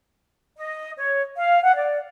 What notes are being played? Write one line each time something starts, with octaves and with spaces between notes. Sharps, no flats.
D#5
C#5
F5
F#5
D5